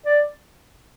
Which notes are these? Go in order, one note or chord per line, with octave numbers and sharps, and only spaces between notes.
D5